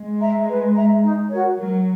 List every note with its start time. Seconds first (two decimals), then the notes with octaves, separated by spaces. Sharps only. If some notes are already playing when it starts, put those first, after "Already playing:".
Already playing: G#3
0.19 E5 A#5
0.47 B4
0.74 E5 A#5
1.02 D#4
1.29 F#4 A#4 C#5
1.58 F#3 A#4